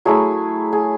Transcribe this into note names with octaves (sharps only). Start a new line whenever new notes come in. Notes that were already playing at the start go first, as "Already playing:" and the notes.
F#3 A3 E4 G#4
G#4